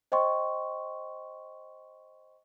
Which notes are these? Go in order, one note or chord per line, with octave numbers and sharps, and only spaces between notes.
C5 D#5 G5 C6 C#6